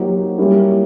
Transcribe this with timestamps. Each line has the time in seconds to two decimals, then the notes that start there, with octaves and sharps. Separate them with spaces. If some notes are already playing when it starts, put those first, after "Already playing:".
Already playing: F#3 A#3 D#4 G4 C5
0.38 G3 A#3 C#4 E4